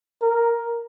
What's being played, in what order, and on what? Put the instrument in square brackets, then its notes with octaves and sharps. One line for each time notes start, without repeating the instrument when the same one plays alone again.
[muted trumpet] A#4